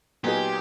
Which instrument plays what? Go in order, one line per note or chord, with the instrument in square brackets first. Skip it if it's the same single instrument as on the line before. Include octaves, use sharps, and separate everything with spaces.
[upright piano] A#2 F#3 B3 D#4 G#4 [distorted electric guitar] G4